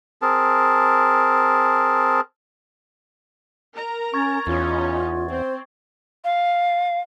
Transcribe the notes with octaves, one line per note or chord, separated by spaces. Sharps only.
C4 G#4 A#4 A5
A#4 A#5
C#4 C#6 G#6 A6
E2 C#4 D#4 F4
C4 C5
F5